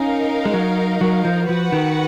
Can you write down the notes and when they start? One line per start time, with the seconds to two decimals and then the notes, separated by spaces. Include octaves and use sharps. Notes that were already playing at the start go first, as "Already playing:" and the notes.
Already playing: C#4 D#4 A#4 F5
0.45 G#3
0.54 F#3
1.01 F#3
1.25 F3
1.49 F3 F#4 B4 F#5
1.72 D#3